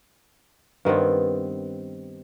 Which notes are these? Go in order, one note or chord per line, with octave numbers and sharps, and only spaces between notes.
G2 D#3 B3 C4